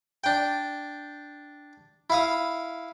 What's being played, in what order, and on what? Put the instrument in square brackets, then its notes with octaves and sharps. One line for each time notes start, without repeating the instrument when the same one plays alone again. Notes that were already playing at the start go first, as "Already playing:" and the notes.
[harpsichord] D4 G5
E4 F5 D#6